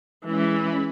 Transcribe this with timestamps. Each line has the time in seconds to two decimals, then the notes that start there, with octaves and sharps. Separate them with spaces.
0.25 E3 G#3 C#4 B5